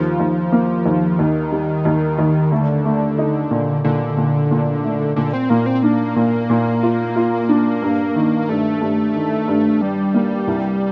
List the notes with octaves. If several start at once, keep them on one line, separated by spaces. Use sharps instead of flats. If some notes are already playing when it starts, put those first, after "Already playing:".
Already playing: D#2 F3
D#2
A#3
D#2
D#2 D#3
G3
D#2
D#2
D3 A3
A3
D#4
A#2
A#2 D3
A#2
A#2
A3
A#2 D3
C4
A#2 A#3
C4
A#3 D4
A#2
A#2
F4
F4
D4
G2
D#3
G2 A3
G2
D#3
G2
G2 G3
A#3
C2